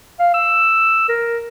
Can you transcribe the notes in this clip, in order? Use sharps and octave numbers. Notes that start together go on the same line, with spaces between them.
F5
E6
A#4